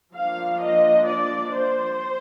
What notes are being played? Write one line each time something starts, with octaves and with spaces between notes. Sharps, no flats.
F3 A#3 D4 F5
D#5
D5
C5